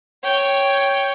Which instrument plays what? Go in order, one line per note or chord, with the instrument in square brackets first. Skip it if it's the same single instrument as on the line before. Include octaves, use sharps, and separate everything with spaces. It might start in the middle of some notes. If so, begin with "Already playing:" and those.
[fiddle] C#5 G5